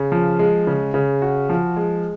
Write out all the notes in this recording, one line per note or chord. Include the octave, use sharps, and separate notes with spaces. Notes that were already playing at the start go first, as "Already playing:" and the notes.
Already playing: C#3
F3
G#3
C#3
C#3
F#4
F3
G#3